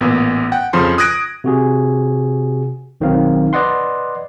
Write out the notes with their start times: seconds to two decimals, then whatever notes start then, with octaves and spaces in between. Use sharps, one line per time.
0.01 A1 A#2 B3
0.52 F#5 G5
0.73 F2 C#3 F3 C6
0.98 D#6 F#6 G#6 A#6 D7 D#7
1.44 C3 F#4 G#4
3.01 B1 D#3 F#3 C4 F5
3.53 B4 D5 D#5 F#5 C6